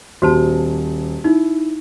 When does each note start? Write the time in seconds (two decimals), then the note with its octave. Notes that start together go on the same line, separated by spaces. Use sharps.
0.22 D#1 F#4 C5 A5
1.24 D#4 E4